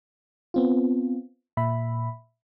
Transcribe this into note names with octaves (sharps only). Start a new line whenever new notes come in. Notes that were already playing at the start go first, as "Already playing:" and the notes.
B3 C4 F4
A#2 E5 B5